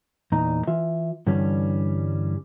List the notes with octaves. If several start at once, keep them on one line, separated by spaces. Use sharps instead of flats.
E2 A#2 D#4 A#5
E3 F4 E5
G2 D3 E3 G3 C#4